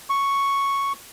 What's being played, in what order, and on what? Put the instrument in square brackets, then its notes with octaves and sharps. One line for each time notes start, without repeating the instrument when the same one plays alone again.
[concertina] C#6